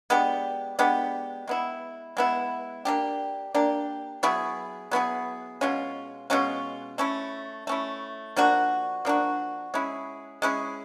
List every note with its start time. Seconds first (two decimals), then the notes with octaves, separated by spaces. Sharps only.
0.10 G#3 B3 D4 G4
0.79 G#3 B3 D4 G4
1.48 G#3 B3 E4
2.17 G#3 B3 E4
2.85 A#3 D4 G4
3.54 A#3 D4 G4
4.23 F#3 B3 E4 G#4
4.91 F#3 B3 E4 G#4
5.61 B2 G#3 C#4 F4
6.30 B2 G#3 C#4 F4
6.98 A3 C#4 E4
7.67 A3 C#4 E4
8.36 F3 A#3 D4 F#4
9.05 F3 A#3 D4 F#4
9.74 G#3 C#4 E4 G#4
10.42 G#3 C#4 E4 G#4